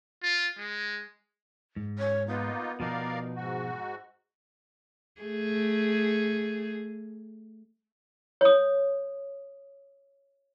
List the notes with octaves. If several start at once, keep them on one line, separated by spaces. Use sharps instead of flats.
F4
G#3
G#2
C#5
A#3 B3 D#4 F4
B2 F3 D#4 A#4 D5 F5
G#2 F#4
A3 G#4
C#5 D#6